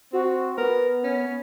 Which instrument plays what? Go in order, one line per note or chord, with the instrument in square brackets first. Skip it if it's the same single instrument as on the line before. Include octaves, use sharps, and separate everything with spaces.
[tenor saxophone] C4 [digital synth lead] F#4
[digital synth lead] B3 [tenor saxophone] A#4
[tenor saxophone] C#4